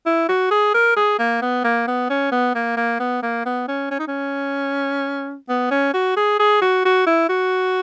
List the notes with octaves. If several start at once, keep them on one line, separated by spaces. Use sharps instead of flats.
E4
F#4
G#4
A#4
G#4
A#3
B3
A#3
B3
C#4
B3
A#3
A#3
B3
A#3
B3
C#4
C#4
D#4
C#4
B3
C#4
F#4
G#4
G#4
F#4
F#4
E4
F#4